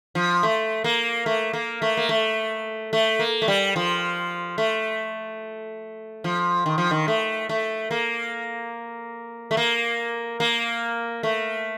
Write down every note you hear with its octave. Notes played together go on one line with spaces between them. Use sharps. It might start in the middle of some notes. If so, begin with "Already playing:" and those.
F3
A3
A#3
A3
A#3
A3
A#3
A3
A3
A#3
A3
G3
F3
A3
F3
D#3
F3
D#3
A3
A3
A#3
A3
A#3
A#3
A3